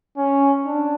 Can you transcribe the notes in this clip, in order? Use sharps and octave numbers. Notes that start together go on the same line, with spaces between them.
C#4
D4